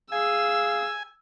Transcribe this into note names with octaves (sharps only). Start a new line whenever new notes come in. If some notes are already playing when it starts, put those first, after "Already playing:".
G#4 F5 G#5 E6